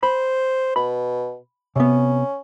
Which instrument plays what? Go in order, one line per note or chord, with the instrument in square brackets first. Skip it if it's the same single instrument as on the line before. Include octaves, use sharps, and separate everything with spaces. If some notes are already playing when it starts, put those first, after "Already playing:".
[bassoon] C5 [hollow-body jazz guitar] B5
[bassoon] B2 [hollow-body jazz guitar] B5
[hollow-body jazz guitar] C3 B3 [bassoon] C#4